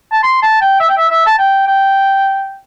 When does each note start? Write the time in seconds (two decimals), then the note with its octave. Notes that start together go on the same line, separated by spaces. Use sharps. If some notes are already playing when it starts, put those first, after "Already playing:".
0.12 A5
0.23 C6
0.42 A5
0.61 G5
0.80 E5
0.89 G5
0.97 E5
1.09 E5
1.26 A5
1.38 G5
1.67 G5